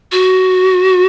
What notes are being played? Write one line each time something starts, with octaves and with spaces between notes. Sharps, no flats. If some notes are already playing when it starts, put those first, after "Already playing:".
F#4